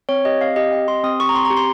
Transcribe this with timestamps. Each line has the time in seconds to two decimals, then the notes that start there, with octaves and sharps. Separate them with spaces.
0.09 C4 C#5
0.25 G4 D#5
0.41 C4 F5
0.56 G4 D#5
0.72 C4 D#5
0.88 G4 C6
1.03 C4 D#6
1.20 G4 C#6
1.29 A#5
1.34 C4 C6
1.45 A#5
1.50 G4
1.57 C6